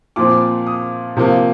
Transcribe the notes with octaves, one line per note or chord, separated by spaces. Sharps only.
A#2 F3 C4 D6
D#6
C3 F3 A#3